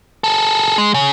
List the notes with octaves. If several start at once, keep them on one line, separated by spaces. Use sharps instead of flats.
G#4 A4
G#3
C#3